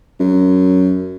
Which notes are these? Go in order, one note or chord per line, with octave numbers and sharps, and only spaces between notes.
F#2